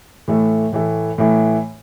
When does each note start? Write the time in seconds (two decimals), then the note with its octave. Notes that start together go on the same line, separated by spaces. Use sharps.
0.28 A2 E3 A3
0.72 A2 E3 A3
1.18 A2 E3 A3